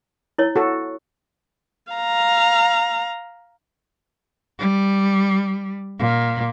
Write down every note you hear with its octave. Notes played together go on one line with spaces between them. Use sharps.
E4 C#5
F#4 A4
F5 A#5
G3
A#2